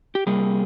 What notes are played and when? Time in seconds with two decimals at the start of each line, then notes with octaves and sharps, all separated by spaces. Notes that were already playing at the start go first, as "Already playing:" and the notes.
0.15 G4
0.27 C3 G3 A#3 G#4